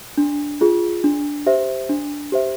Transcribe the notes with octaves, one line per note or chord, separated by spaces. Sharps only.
D4
F4 G#4
D4
G4 C5 E5
D4
G4 C5 E5